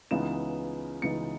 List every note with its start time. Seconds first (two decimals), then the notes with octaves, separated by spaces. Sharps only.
0.11 C#2 C#3 E3 B3 D#4 E7
1.02 C#2 C#3 E3 B3 D#4 C#7